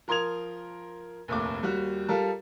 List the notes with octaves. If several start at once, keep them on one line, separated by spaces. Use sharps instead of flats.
F3 A#4 C6 D#6 G#6 F7
F1 A#1 D#2 A3 D6
D#2 G3 F#4
G3 F4 A4 A#4 A5